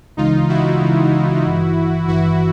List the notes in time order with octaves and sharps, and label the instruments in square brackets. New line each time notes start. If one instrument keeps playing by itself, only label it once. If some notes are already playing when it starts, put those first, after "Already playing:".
[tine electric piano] C#2 C#3 E3 G#3 [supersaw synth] D#4 F4
[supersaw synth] E4 F#4
[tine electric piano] C#2 C#3 E3 G#3
G#1 G2 E3
[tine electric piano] G#1 G2 E3 [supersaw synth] E4 F#4